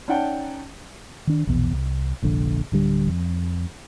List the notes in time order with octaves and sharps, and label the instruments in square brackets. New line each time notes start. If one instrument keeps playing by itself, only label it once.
[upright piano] C#4 D#4 D5 F#5 G5 A5
[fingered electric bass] D#3 D4
A#1 E2 B2
C2
F1 A#1 D3
D1 D3 G3
F2